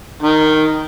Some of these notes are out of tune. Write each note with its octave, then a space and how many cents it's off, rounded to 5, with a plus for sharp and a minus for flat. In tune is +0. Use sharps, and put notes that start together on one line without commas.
D#3 -5